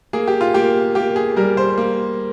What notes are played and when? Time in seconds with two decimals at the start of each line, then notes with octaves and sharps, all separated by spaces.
0.13 A#3 G#4
0.28 G4
0.41 F4
0.54 A#3 G4
0.95 A#3 G4
1.16 G#4
1.37 G3 A#4
1.57 C5
1.78 A#3